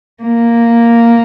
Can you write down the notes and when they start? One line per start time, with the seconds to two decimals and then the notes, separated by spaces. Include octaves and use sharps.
0.23 A#3